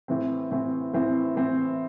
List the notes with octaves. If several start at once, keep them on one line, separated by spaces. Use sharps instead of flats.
A2 E3 C4
A2 E3 C4
A2 E3 C4
A2 E3 C4